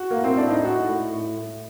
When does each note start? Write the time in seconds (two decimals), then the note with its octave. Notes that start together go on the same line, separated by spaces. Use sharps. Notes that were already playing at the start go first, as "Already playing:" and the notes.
Already playing: F#4
0.11 A#3
0.16 A2
0.24 C4
0.37 A2 D4
0.50 D#4
0.65 A2 F#4
0.89 A2
1.14 A2
1.37 A2